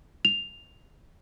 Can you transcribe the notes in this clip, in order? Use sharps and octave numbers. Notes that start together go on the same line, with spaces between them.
F7